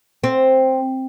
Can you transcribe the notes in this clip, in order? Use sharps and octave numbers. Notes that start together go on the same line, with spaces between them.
C4